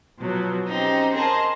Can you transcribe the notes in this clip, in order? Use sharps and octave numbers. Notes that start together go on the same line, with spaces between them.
B2 F3 F#3
C4 C#4 D#4 G4
G#4 A#4 C5 D#5 A5